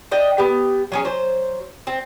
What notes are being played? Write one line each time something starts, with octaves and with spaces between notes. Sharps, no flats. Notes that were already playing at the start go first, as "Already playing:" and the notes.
D4 D#5 G5
B3 G4
F#3 C#4 G#4
F#3 C5
C4